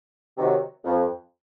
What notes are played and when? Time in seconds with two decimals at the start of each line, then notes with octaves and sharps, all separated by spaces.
0.36 C3 D#3 F#3
0.84 F2